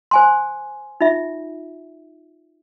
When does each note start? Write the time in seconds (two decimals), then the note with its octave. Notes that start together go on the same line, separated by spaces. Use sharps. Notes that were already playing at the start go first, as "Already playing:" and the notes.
0.11 C5 G#5 C6
1.01 D#4 F4 E5